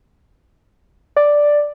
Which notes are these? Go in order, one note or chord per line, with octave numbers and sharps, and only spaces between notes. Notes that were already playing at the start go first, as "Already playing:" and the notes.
D5